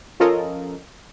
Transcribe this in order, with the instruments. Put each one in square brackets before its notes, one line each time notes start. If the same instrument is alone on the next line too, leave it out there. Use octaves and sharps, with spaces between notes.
[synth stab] F3 C#4 F4 A4 A#4 D#5